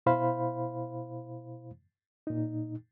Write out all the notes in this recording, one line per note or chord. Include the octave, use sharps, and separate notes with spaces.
B2 E4 C5 F5 B5
A#2 D#4